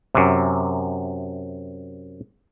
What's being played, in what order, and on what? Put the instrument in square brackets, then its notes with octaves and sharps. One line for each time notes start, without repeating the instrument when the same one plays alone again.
[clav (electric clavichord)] F#2 C3